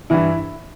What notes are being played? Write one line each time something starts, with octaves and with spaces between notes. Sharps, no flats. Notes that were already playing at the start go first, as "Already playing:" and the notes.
G2 E3 E4